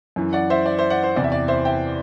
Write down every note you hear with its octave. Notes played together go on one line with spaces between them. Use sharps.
F#2 E3
D5 F#5
C5 E5
D5
C5 E5
D5 F#5
C5
E2 C3 E3 D5
E5
D5
C5 E5
E5 G5